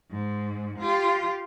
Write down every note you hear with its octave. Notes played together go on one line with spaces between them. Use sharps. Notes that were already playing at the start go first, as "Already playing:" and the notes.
G#2
F4 G4